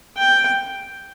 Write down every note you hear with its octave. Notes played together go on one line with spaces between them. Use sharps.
G5